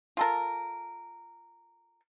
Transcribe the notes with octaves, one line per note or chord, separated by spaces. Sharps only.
F4 A4 A#4